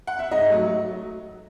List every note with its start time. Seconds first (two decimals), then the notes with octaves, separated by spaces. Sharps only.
0.07 F#5
0.19 E5
0.31 G#2 D#5
0.50 F#3 A3